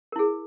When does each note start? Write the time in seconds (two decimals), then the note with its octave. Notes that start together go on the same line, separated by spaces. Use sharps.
0.12 A#4
0.16 E4
0.19 G#4